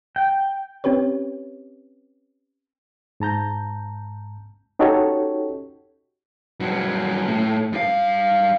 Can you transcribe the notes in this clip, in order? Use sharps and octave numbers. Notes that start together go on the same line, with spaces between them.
G5
C4 C#4 G4 B4 C#5
G#2 A5 A#5 G6
C#4 D#4 F#4 G4 A4 C#5
G2 F#3
A2
G2 F5